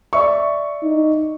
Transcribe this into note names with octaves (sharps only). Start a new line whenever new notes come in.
D5 E5 C#6
D#4